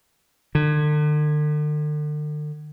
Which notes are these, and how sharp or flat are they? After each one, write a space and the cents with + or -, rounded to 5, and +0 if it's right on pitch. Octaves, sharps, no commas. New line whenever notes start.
D3 +40